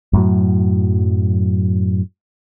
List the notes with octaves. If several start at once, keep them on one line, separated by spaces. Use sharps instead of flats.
F#2 A2 F#3